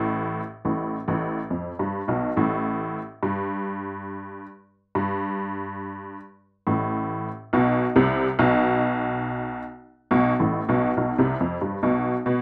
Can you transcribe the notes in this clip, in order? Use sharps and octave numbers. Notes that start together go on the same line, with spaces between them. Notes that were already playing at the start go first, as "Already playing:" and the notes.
Already playing: A1 A2
A1 A2
A1 A2
F2
G2
B1 B2
A1 A2
G2
G2
A1 A2
B1 B2
C2 C3
B1 B2
B1 B2
A1 A2
B1 B2
B1 B2
C2 C3
F2
G2
B1 B2
B2